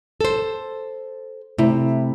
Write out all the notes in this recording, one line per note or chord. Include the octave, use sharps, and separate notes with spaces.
A4 C5
C3 A3 E4